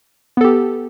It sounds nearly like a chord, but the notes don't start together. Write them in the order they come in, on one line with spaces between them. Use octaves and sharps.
B3 A4 G4